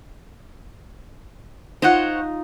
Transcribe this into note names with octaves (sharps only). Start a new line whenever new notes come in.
D#4 F4 C5 C#5 F#5